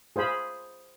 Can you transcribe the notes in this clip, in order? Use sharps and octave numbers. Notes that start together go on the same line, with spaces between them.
G#4 C5 F5 B5